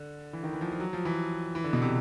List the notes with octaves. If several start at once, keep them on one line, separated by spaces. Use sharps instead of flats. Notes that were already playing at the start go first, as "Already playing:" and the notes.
Already playing: D3
E3
D#3
E3
F3
F3
F#3
F3
E3
E3
D3
B2
C3